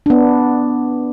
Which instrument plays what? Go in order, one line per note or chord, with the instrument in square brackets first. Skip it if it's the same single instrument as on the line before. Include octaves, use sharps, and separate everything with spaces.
[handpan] B3 D4